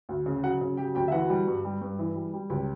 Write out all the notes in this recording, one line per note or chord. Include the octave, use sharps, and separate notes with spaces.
D2
C#3
F#3 F#4 F#5
C#3
F#3 G4 G5
D2 G4 G5
E5
E3 F#4 F#5
G3
G2
G3
G2
E3
G3
G3
C#2 G4 G5